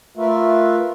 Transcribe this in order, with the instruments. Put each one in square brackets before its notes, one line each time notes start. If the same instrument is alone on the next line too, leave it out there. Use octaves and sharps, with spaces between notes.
[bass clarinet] A3 [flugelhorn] F4 [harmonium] A#4 B4 E5